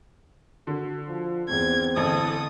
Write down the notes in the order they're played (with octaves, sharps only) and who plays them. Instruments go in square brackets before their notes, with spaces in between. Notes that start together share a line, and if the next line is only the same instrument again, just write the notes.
[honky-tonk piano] D3 [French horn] F#4
[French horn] F3
[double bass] E2 [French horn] C4 [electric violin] G#6
[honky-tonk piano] A1 [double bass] D3 [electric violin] A4 D#6